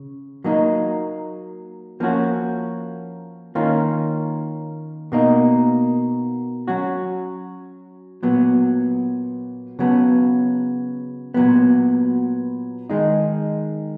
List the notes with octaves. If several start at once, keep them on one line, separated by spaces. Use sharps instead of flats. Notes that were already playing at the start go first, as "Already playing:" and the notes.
Already playing: C#3
F#3 A#3 D#4
F3 A#3 C#4 F#4
D#3 A#3 C#4 F4
B2 A#3 D#4
F#3 C#4 F#4
A#2 F#3 B3
C#3 F#3 B3
A#2 F#3 B3
D#3 G#3 D#4